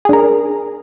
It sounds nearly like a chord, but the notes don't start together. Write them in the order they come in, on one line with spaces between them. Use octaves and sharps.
G#4 D4 A#4